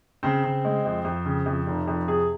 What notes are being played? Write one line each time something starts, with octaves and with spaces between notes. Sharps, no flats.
C#3 C4 C5
C#3
G#3
F2
F2
C#3
F2
F1
F2
C3 G#4